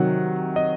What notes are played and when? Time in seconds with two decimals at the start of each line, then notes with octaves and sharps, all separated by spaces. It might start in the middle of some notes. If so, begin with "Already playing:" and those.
Already playing: C3 D#3 F#3 F#5
0.56 D#5